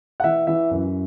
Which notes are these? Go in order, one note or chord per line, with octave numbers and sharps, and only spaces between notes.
F#5
E3 E5
E3 E5
F#2